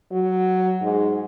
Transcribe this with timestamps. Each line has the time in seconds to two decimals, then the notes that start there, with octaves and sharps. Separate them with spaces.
0.12 F#3
0.82 G#2